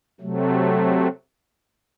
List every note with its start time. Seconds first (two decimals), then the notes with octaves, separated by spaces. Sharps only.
0.21 C3 F#3 A3